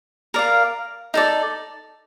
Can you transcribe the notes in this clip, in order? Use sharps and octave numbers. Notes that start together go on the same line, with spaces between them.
A#4 D5 F5
D#4 A4 D5